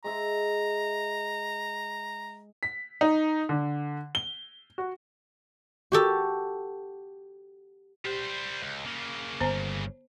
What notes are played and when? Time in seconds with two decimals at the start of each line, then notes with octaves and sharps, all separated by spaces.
0.04 G#3 E5 A#5
2.63 B6
3.01 D#4
3.49 D3
4.15 G7
4.78 F#4
5.92 F#4 G4 A4
8.05 G3 G4 C5
8.61 C#2
8.85 C#3 A#3
9.41 G1 B3 C5 A#5